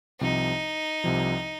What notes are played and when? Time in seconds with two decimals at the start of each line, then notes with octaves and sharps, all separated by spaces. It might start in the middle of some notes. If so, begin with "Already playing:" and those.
0.21 C2 C3 F3 D#4
1.04 C2 C3 F3